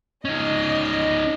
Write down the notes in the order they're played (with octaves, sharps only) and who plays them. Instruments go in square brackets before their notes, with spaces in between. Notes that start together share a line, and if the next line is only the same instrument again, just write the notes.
[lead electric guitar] C#4 D#4 [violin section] D#5